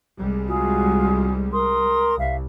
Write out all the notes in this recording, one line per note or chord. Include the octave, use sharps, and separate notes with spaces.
C2 G3 G#3
F4 F#4 G#4
A#4 C6 D#6
C2 E5 F5